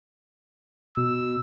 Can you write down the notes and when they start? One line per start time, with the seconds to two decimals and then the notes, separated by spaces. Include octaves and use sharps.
0.97 B2 E6